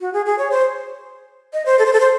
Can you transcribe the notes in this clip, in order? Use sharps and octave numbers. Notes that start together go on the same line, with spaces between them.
F#4
G#4
G#4
C#5
C5
D#5
C5
A4
C5
A4
C5